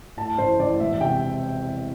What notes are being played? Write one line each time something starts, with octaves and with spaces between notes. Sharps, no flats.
A2 A5
A1 C5
A1 D5
E1 E5
C3 G5